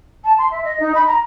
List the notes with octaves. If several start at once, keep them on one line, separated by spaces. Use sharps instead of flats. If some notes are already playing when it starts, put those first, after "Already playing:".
A5
C6
E5
D#5
D#4
B5
A#5